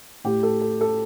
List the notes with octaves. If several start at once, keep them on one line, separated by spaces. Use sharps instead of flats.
A2 G4
A4
A4
A4